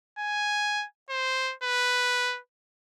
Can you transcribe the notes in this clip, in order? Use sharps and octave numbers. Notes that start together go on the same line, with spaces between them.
G#5
C5
B4